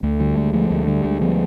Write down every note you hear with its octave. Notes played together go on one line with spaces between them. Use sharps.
D2 A3
D3 G3
D2 G#3
F3 A3
D2 A3
D3 G3
D2 G#3
F3 B3